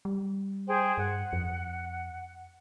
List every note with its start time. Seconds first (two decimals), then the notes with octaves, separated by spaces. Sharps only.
0.05 G3
0.67 G#4 C5 G5
0.98 G2 F#5
1.33 F2